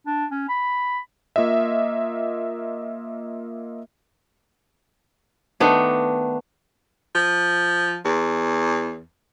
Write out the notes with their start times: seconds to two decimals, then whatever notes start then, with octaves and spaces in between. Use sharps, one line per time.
0.07 D4
0.31 C#4
0.49 B5
1.36 A#3 F4 D#5 E5
5.60 D#3 A3 B3 D4
7.15 F3
8.05 E2